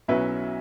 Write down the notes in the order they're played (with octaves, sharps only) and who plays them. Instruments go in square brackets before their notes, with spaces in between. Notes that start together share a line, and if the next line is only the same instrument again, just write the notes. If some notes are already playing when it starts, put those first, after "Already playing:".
[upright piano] B1 B2 F#3 C#4 E4 B4 E5